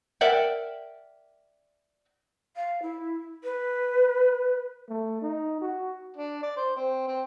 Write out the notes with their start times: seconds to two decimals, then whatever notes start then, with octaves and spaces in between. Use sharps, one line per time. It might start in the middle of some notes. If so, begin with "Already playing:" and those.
0.21 A#4 D5 E5 F#5 G5
2.56 F5
2.82 E4
3.44 B4
4.89 A3
5.22 D#4
5.61 F#4
6.17 D4
6.43 D5
6.57 C5
6.76 C4
7.08 C4